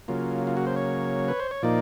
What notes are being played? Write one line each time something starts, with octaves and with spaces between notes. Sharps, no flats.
C#3 F#3 A#3 F4
F4
F#4
C5
C#5
B4
C5
C#5
A#2 F3 A#3 D#4 D5